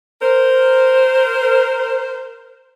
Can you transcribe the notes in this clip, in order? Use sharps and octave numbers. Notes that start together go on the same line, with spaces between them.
A#4 C5